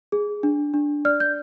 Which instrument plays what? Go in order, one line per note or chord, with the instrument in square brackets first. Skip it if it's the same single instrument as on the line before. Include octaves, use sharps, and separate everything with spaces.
[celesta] G#4
D4
D4
D5 F6
G6